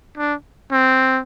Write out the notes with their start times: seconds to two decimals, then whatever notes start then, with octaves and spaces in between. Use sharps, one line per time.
0.18 D4
0.72 C4